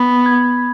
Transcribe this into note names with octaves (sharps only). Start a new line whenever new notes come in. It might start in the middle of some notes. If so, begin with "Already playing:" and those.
Already playing: B3 B5
G#6